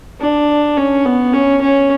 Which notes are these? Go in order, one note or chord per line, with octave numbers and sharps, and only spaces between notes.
D4
C#4
B3
C#4
C#4